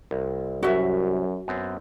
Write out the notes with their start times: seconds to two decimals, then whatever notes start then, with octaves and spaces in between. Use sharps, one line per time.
0.11 C2
0.63 C2 F#2 F#4 E5
1.48 F#2 B3 C4